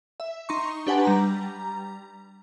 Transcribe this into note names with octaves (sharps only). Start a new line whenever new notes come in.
E5
D#4 A#5 C6 C#6
D4 G4 B4 F#5 G#5 A5
G3 A#5